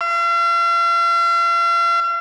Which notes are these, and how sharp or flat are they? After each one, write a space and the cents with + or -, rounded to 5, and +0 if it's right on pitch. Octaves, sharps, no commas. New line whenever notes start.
F5 -45